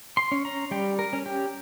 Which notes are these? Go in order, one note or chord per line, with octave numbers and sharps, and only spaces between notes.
C6
C#4
A#5
G3 G5
A#4
C#4
G4